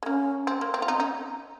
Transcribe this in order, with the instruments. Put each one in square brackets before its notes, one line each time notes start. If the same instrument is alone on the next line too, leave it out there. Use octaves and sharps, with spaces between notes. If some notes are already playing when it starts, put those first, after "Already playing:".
[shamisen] G#3
[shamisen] A#3 [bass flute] C#4
[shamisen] C4
A#3
C4
F4
[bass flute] C4 [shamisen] D#4
[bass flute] C#4 [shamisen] D#4